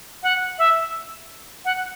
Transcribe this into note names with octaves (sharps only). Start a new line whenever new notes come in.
F#5
E5
F#5